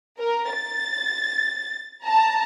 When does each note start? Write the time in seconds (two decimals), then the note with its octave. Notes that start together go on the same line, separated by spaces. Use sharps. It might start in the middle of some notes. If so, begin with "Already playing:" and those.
0.20 A#4
0.52 A6
2.05 A5 A#5